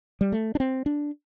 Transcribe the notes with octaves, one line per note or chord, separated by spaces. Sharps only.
G3
A3
D4
C4
D4